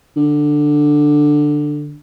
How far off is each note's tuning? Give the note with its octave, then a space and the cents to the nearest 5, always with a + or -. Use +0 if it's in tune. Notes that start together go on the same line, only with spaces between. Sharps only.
D3 +10